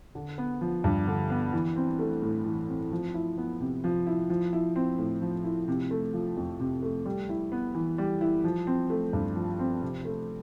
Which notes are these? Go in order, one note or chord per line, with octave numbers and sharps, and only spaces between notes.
D3
B3
F3
G2
D3
B3
E3
C4
A3
A2
E3
C4
F3
E4
B3
C3
F3
E4
F3
E4
C4
A2
F3
E4
C3
A3
F3
F2
C3
A3
G3
E4
B3
E3
G3
E4
F3
C4
A3
G2
F3
C4
C3
A3